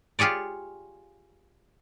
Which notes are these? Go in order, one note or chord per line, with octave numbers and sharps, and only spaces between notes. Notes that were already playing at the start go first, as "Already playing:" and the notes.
F4 G4 G#4 C#5 D5